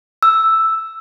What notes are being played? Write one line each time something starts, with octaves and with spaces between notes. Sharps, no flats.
E6